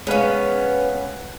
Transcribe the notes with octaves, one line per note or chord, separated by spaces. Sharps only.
G#3 B3 C#4 B4 F5